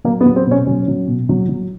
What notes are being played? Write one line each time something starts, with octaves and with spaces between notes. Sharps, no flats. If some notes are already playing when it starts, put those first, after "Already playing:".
F#3 A#3
B3
F#3
C4
B2 C#4
F#3 C#4
F#3
B2
F#3
F#3